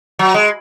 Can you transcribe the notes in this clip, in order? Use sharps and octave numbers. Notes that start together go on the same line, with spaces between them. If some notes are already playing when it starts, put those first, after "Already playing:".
F#3
G#3